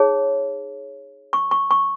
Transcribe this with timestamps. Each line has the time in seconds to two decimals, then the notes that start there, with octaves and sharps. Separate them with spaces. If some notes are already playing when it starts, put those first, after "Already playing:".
Already playing: D#4 G#4 C#5
1.33 C#6
1.51 C#6
1.71 C#6